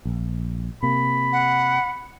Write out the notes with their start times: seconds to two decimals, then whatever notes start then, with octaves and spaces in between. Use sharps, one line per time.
0.05 A#1
0.83 C3 A#3 B5
1.32 F#5